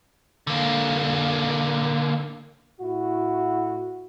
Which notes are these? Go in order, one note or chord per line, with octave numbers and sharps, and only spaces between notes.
D3 A#3
A2 E4 F#4